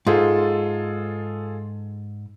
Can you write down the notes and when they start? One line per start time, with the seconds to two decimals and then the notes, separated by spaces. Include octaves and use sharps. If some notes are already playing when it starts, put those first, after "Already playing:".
0.07 G#2 F4 G#4 A4